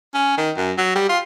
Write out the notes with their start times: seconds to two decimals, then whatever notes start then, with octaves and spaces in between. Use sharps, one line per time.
0.14 C#4
0.37 D#3
0.57 F#2
0.78 F#3
0.95 G3
1.09 F4